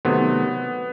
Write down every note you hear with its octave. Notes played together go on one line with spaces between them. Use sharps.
C3 D#3 F#3 A3 B3